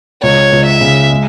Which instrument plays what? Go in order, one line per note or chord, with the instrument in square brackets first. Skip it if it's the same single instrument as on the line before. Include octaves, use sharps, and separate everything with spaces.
[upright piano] C#2 [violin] C#5
[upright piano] C#2
[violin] E5
[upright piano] C#3
G#3